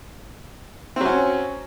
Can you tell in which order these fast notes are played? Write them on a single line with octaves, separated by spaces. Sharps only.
C4 F#3 C#4